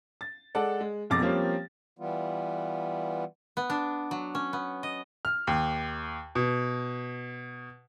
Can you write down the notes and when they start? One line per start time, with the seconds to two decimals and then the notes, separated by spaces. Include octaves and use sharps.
0.21 A6
0.55 G#3 A4 D5 F#5
0.81 G#3
1.10 E1 F2 D6 A6 A#6
1.21 F3 G3 A#3 C4 C#4 G4
1.99 E3 G3 B3 F4
3.57 B3
3.70 D4
4.11 F#3
4.35 C#4
4.53 B3
4.83 D#5
5.25 F6
5.47 D#2
6.35 B2